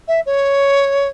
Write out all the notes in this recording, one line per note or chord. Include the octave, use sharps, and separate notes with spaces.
E5
C#5